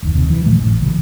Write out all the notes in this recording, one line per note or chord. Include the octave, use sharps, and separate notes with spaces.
F#1 D#2
E1 D#2 C3
E3
A#2 D#3 F3 A3
A1 A2
A#1 F2 C#3 E3